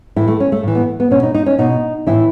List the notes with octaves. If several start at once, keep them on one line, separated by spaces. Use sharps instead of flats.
A2 E3 E4
A3
C#4
A3
A2 E3
B3
B3
B2 C#4
D#4
D#4
C#4
B2 D#4
A2 E3 E4